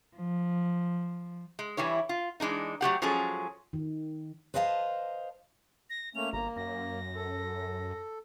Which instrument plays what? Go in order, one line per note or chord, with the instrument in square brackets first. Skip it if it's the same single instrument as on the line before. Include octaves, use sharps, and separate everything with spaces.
[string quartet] F3
[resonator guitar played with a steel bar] G#3
E3 G3 E4 C#5
F4
E3 G#3 D4 D#4
F#3 A3 G4 F#5
F3 F#3 G#3 C#4 G#4 A4
[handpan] D#3
[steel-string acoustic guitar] B4 C5 D#5 F5 G#5 A5
[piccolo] A#6
[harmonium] A3 A#3 C#4 [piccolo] F7
[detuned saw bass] G1 [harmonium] A#3 [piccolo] A#5
[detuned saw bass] F#2 [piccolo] A#6
[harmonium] A4